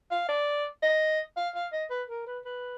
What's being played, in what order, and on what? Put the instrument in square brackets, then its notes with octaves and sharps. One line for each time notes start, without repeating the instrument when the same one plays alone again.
[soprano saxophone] F5
D5
D#5
F5
F5
D#5
B4
A#4
B4
B4